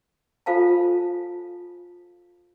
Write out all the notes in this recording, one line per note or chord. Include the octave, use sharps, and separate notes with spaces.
F4 A4 C5 F5 G#5 A5